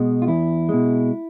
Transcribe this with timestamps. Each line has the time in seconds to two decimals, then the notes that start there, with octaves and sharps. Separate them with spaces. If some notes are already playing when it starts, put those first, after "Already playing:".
Already playing: B2 G#3
0.22 F4
0.27 E2 E4
0.69 B2 G#3